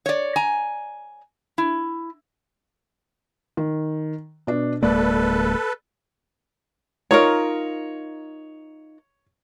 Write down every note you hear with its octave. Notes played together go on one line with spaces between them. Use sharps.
C#5 D5
G#5 A#5
E4
D#3
B2 D4
D1 G#3 A#3 A4 B4 D5
D#4 F4 A#4 C#5